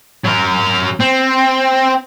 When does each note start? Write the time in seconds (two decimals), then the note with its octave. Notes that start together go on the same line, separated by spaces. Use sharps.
0.24 F#3 A#4
1.00 C4